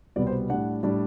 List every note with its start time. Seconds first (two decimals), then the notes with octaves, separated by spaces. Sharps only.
0.16 C2 B2 G3 B3 D5
0.27 C5
0.49 A2 G3 D4 F#5
0.83 A2 G3 D4